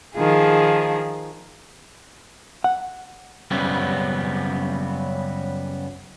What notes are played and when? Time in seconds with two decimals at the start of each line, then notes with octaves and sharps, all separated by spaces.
0.16 D#3 F3 G#4
2.64 F#5
3.51 F#2 C#3 G3 B3 C4